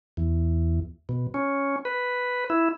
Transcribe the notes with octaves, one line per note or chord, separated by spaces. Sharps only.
E2
B2
C#4
B4
E4